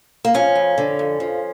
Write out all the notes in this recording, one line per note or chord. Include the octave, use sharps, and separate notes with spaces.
A#3
F3 C#4
F2
D3
F2
F3